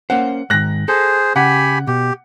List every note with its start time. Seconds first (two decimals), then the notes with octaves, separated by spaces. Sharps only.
0.10 A#3 C#4 C5 F#5
0.50 G#2 D#3 F#6 A#6
0.88 G#4 A4 C5
1.36 C#3 G4 F#5 G#5 B5
1.87 B2 G4